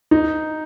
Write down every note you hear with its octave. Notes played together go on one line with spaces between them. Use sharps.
D#4